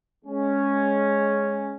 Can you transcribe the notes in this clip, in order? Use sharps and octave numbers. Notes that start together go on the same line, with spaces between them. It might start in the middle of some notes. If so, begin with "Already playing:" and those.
G#3 C#4